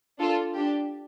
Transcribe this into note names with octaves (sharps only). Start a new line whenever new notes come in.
D4 F4 A4
D4 G4